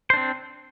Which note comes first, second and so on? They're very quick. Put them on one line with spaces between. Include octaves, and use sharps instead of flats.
C5 D4 C4